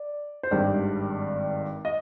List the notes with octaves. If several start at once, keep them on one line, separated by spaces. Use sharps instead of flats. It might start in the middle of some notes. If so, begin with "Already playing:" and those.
Already playing: D5
C5
G#1 G2 D#3 G3 D5
D#5